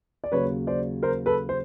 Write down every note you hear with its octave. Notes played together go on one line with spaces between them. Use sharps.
D5
D#2 C#3 F#3 B4 C#5
C5 D5
A#4 C5
A4 B4
C5